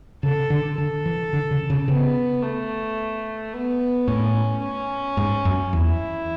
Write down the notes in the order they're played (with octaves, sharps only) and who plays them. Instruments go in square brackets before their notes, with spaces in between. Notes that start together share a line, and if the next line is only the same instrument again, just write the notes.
[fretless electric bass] C#3 [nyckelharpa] A4
[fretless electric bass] D3
[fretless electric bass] D3 [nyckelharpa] A4
[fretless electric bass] E3
D3
C#3
C#3
[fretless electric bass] C#3 [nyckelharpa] B3
[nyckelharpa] A3
B3
[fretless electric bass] A2 [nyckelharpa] C#4
[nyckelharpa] C#4
[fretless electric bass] G#2
F#2
[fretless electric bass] E2 [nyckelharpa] E4